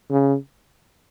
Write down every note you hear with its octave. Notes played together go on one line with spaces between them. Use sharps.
C#3